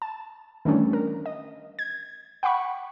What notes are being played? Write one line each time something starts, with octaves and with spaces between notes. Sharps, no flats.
A5
D#3 E3 G3 A3 C#4 D4
A#4
D#5
G#6
F#5 G5 B5 C#6